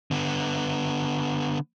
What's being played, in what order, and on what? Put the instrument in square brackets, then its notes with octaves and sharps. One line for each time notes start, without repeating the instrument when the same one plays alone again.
[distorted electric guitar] D3 B3